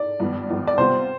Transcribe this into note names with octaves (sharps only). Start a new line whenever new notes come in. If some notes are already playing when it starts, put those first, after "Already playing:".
Already playing: D5
G#1 G2 F3 B3
G#1 G2 F3 B3
D5
C3 G3 B3 F4 C5